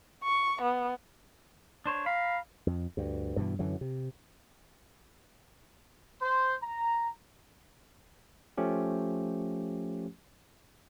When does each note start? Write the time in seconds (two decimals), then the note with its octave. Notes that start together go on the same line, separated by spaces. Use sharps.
0.24 C#6
0.62 B3
1.86 D4 C5 C#5
2.06 F5 A#5 B5
2.67 F2
2.97 D2 G2
3.37 G2 B2 E3
3.59 F#2 D3 E3 F#3
3.81 C3
6.21 C5
6.61 A#5
8.58 F3 A3 C#4 G4